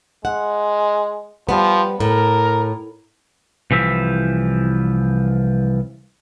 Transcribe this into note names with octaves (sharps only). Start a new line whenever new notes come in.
G#3 F#5
F3 G3 B3
A2 A#4
C2 E3 F3 E5